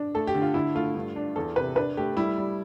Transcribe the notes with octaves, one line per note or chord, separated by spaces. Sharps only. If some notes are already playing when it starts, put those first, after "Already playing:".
Already playing: D4
A3 A4
G4
D3
F4
D3 E4
A3 F4
G2
D4
E2 A4
C3 B4
D4 B4
A3 G4
G3 E4
G3